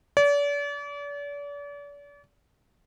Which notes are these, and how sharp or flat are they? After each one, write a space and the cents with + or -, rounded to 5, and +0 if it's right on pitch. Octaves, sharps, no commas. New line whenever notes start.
D5 -40